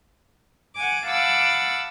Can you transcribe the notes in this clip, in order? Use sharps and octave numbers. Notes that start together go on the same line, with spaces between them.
F#5 G#5 D6
F5 F#5 A5 B5 D6 E6